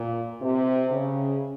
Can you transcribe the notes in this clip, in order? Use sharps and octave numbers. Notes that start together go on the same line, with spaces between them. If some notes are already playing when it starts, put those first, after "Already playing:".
Already playing: A#2
C3
C#3